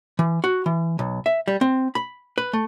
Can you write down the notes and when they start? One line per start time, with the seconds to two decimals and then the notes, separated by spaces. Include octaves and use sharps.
0.19 E3
0.44 F#4
0.66 E3
0.99 B1
1.26 E5
1.48 G3
1.61 C4
1.95 B5
2.38 B4
2.53 A3